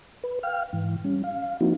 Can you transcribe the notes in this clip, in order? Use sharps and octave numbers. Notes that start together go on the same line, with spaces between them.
B4
F5 G5 F6
G#2 E3
G3 C#4
F5
F3 A#3 C4 D#4 E4 F#4